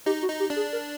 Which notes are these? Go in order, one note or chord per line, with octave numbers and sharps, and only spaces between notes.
D#4 G4
F#4
D#4
G4
D4
G#4
A#4